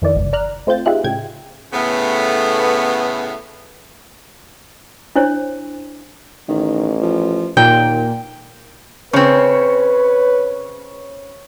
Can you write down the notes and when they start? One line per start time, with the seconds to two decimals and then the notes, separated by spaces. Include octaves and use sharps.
0.02 F2 D#3 E3 D5
0.15 G1 C#2
0.33 D5 A#5 F6 F#6
0.67 A3 C4 F4 G6 A6
0.86 D#4 F4 G4 G#4 E5 F#6
1.04 A2 C#3 G5 G#6
1.73 A2 C#3 A3 B3
5.16 D4 E4 C5 C#5
6.48 A1 D#3
7.02 F3
7.57 D#2 A#2 G5
9.13 C#3 C4 B4 C#5